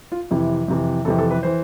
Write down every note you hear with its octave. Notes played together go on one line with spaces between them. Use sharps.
F4
F2 C3 E3 E4
F2 C3 E3
F2 C3 E3 A4
A4
B4
E3 C5